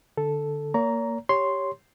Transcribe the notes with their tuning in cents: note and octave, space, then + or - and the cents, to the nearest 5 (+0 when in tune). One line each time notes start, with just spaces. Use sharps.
D3 +0 A4 +0
A#3 -10 C#5 +45 A#5 +0
G4 +0 C#5 +0 C6 +0